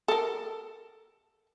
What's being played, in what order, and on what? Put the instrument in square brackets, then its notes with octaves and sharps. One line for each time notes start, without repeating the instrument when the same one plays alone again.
[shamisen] A4 A#4